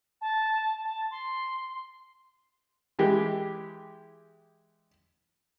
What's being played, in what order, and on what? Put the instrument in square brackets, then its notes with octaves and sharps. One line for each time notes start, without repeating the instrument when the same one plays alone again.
[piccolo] A5
A5
C6
[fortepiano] E3 G#3 G4